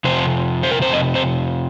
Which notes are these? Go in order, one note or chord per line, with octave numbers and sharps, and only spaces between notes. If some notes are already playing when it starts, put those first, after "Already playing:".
F2 C3 C5
C5
A#4
C5
D#5
C5